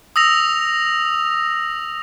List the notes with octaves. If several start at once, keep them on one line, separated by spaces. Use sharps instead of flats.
D#6 E6 A#6 F7